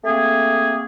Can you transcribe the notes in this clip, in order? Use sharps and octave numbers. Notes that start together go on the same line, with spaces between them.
A3 A#3 C4 G#4